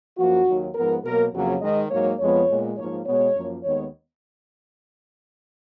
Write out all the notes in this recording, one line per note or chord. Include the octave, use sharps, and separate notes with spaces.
F#2 F3 A#3 F#4
D#2 D#3 F#3
G#2 F3 B3 A#4
B2 F#3 A#3 A#4
F2 C#3 F#3 A#3
G#2 D#3 G#3 D#5
G#2 F#3 A#3 C#5
F2 F3 G#3 B3 C#5
A#2 G#3 B3
G#2 F3 A#3 C#5
B2 G#3 B3 C#5
F#2 F3 A#3
D#2 D#3 G#3 B3 C#5